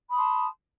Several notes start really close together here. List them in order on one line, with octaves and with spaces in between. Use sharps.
B5 D#6 C6 A5